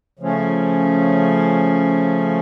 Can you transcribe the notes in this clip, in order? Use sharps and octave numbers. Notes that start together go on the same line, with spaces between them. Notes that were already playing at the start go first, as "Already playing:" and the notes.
C#3 F3 A3 C#4